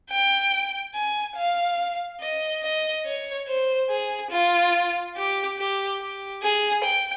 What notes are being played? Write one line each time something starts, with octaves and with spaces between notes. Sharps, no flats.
G5
G#5
F5
D#5
D#5
C#5
C5
G#4
F4
G4
G4
G4
G#4
G5